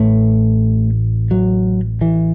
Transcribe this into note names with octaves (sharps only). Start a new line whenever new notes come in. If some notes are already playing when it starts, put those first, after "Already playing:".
Already playing: A1 A2 A3
F#3
E3